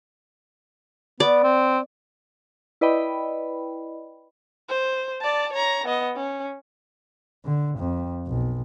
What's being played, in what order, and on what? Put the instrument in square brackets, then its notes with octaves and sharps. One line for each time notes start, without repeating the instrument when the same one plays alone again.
[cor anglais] B3 [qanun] D5
[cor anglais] C4
[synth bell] E4 B4 D5 D#5 G5 B5
[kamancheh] C5
D5 A5
C#5 A#5
B3 D#5
C#4
[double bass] D3
F2
B1